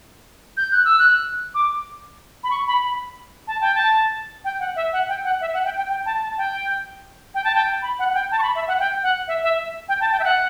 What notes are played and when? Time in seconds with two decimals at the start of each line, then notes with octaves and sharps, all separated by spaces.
0.57 G6
0.72 F#6
0.85 E6
0.99 F#6
1.55 D6
2.44 B5
2.51 C#6
2.67 B5
2.83 B5
3.47 A5
3.61 G5
3.75 A5
4.45 G5
4.60 F#5
4.76 E5
4.93 F#5
5.09 G5
5.24 F#5
5.41 E5
5.54 F#5
5.65 G5
5.77 G5
5.89 G5
6.06 A5
6.22 A5
6.38 G5
7.35 G5
7.44 A5
7.55 G5
7.82 B5
7.99 F#5
8.09 F#5
8.14 G5
8.32 A5
8.39 C#6
8.42 B5
8.55 E5
8.68 F#5
8.80 G5
9.03 F#5
9.28 E5
9.43 E5
9.89 G5
10.01 A5
10.12 G5
10.20 E5
10.24 F#5